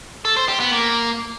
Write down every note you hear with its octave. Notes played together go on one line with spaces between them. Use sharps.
A4
C5
G4
B3
A#3